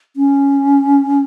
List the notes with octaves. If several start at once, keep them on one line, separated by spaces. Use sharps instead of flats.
C#4